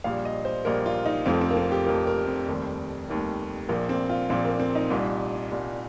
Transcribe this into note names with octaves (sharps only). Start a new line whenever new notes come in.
A#1 A#2 G3 F5
D#5
C5
A#1 A#2 G3 A#4
F4
D#4
F1 F2 F3 C4
C4
A#3
C4
G4
F1 F2 F3 A#4
A#4
C4
F1 D#2 D#3 G3
F1 D#2 D#3 G3
A#1 A#2 F3 A#3
C4
F4
A#1 A#2 F3 C4
A#3
C4
D#4
C2 A#2 G3
C2 A#2 G3